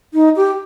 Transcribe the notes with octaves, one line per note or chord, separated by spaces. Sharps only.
D#4
G4